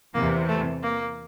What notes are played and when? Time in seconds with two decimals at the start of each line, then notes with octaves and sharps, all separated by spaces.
0.14 E2 C3 E3 A#3
0.48 A3
0.83 A#3